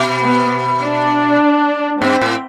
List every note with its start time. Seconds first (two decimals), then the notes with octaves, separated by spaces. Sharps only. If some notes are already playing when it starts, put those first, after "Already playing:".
Already playing: B2
0.22 B3
0.82 D4
2.01 G2 C4
2.21 A2